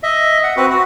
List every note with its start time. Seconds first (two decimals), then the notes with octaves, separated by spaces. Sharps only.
0.03 D#5 E5
0.44 F#5
0.56 C4 F#4 B4
0.70 F#4